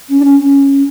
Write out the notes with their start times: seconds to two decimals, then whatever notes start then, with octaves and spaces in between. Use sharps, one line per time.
0.10 C#4
0.20 D4
0.25 C#4
0.40 C#4